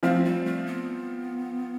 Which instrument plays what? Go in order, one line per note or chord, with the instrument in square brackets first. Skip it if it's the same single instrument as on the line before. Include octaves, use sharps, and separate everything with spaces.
[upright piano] F3 C4 F4 [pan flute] A3
[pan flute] G3
A3
B3